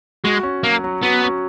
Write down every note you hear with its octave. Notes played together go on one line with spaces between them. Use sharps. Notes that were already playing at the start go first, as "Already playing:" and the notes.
G#3 F#4
C#4
F#3 A#3
F#3
B3 F#4
C#4